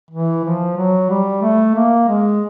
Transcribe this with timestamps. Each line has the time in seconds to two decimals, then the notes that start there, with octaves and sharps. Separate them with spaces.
0.11 E3
0.44 F3
0.77 F#3
1.10 G3
1.42 A3
1.75 A#3
2.08 G#3